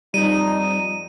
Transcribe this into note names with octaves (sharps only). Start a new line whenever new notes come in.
F2 G3 D#4 D#7